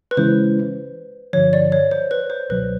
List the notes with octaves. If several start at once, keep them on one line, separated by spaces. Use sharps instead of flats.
B4
C#3 E3 G#3 C#4 E4 C5
G2 D3 F3 C#5
D5
C#5
C5
B4
C5
C#2 B2 F#3 B4